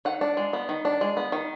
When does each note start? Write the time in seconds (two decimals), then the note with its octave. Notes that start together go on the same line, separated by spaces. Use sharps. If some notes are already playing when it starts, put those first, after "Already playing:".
0.05 D#3 F#5
0.21 D4
0.37 G#3
0.53 B3
0.69 D#3
0.85 D4
1.01 G#3
1.17 B3
1.32 D#3